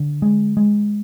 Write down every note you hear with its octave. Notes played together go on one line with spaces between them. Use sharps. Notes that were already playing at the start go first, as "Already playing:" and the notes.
Already playing: D3
G#3
G#3